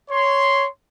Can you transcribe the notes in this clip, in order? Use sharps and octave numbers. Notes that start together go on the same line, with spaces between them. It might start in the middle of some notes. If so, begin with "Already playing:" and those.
C#5 C6